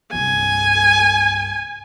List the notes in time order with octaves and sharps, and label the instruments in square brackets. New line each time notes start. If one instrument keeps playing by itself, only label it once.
[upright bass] C2 G2 [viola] G#5